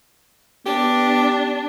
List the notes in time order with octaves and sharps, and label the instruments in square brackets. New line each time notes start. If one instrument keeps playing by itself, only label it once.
[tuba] B3 [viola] D4 [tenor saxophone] G4